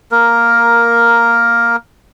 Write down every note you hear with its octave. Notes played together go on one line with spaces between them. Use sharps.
A#3 A#4